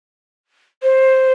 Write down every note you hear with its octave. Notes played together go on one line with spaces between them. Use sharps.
C5